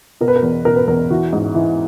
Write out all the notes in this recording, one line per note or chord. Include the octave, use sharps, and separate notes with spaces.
B2 A#4
B4
A#4
E2
B2 A#4
B4
E2 A#4
E3 F#4
G#2
E3